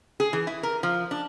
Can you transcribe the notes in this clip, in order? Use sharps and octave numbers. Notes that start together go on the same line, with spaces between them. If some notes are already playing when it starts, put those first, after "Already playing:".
G#4
E3
E4
A#4
F3
D4